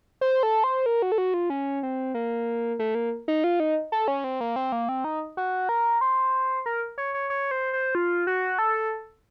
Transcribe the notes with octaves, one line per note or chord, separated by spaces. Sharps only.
C5
A4
C5
A#4
F#4
A4
F#4
F4
C#4
C4
A#3
A3
A#3
D#4
F4
D#4
A4
C#4
C4
A#3
C4
A#3
C4
D#4
F#4
A#4
C5
A#4
C#5
C#5
C#5
C5
C5
F4
F#4
A4